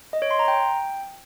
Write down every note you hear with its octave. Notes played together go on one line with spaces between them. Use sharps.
D#5
C#5
C6
A#5
G5